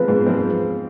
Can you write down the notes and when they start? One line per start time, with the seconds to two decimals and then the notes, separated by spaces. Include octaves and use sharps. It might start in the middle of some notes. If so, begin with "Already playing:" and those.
Already playing: F3 G#3 C4 B4
0.08 G#2
0.26 F3 G#3 C4